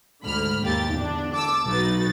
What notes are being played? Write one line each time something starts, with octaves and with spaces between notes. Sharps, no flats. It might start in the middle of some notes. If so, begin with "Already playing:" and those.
D2 G#2 D3 B5 F6
D#2 A#3 G4 A6
E2 D3 D4
A5 D6 E6
B1 F#3 D#4 F#4 B4 A6